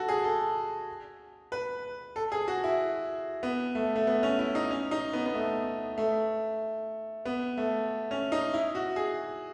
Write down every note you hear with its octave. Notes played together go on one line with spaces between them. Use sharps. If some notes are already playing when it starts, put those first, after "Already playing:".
Already playing: F#4 A4
G#4
A4
B4
A4
G#4
F#4
E4
B3
A3
A3
B3
C#4
E4
D#4
C#4
D#4
B3
B3
A3
A3
B3
A3
C#4
D#4
E4
F#4
G#4